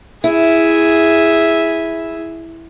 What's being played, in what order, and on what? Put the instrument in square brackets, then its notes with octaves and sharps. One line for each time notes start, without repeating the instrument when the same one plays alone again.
[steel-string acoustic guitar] E4 [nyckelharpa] G#4 E5